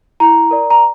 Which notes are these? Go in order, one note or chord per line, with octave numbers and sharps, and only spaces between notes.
E4 A#5
A#4 D5
A#5